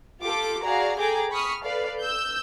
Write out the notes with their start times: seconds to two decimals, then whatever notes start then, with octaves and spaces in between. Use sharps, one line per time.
0.23 F4 G4 A4 D6
0.64 F#4 G#4 D5 F5 A#5
0.98 G#4 A4 G5 A#5 D6
1.31 B5 C#6 D#6 F6
1.64 A4 B4 D5 F5
2.01 E6 G6